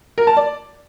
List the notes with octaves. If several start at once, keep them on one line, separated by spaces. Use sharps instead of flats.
A#4
A5
D5